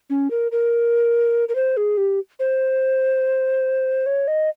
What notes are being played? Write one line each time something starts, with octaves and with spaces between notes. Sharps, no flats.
C#4
A#4
A#4
A#4
C5
G#4
G4
C5
C#5
D#5